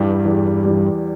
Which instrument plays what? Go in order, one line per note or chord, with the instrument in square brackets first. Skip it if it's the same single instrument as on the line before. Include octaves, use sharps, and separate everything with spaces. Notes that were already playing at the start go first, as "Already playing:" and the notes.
Already playing: [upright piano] E2 E3 G3 [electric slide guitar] G2
[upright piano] E2
E3 G3